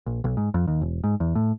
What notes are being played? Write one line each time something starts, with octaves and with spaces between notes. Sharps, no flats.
A#1
B1
G#2
F2
D#2
E1
G#2
E2
A2